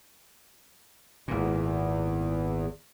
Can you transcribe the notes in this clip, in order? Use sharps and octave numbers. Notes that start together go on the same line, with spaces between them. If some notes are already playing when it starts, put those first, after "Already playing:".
G#1 E2 A#2